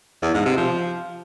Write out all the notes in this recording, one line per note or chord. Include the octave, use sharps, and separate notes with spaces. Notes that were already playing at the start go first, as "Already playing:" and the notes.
E2
G#2
C3
F3